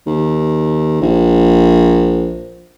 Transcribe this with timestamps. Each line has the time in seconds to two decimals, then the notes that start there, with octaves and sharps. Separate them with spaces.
0.07 D#2
1.02 A#1